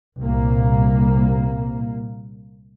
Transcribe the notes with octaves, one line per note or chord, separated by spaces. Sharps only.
C2 A#2 A#3